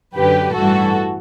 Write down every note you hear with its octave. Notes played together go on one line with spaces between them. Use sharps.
F#2 D3 F#3 G4 B4
A1 G2 E3 G3 F#4 A4